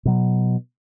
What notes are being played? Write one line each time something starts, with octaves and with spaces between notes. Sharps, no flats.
B2 F#3